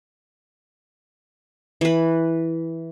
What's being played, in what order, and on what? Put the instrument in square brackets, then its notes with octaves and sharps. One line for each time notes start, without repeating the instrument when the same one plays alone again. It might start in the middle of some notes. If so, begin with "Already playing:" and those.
[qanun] E3 B4